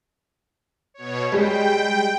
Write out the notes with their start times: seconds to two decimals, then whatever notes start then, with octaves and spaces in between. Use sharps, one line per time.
0.94 B2 C#5
1.32 G3 G#3 G5